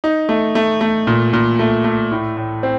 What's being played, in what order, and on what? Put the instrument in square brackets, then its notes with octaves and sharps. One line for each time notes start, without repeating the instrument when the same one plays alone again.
[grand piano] D#4
A3
A3
A3
A#2
A#2
A3
A3
A2
A2
C4